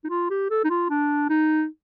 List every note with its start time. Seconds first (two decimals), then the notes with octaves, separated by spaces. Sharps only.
0.04 D#4
0.09 F4
0.30 G4
0.50 A4
0.64 D#4
0.70 F4
0.90 D4
1.30 D#4